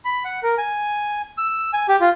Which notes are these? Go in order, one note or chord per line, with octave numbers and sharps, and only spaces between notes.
B5
F#5
A#4
G#5
E6
G#5
G4
F4